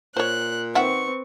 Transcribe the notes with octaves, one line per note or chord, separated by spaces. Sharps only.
A#2 C5 C#5 F#6
D#3 C4 B4 E5 F#5 C#6